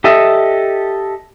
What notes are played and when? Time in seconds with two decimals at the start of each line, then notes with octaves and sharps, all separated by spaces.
0.04 G4 A4 D#5 E5